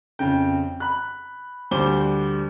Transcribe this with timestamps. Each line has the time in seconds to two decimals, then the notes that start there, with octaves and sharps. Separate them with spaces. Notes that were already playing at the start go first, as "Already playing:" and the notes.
0.19 F2 C#3 G5
0.80 B5 F#6
1.71 D2 G3 C5 D6 G7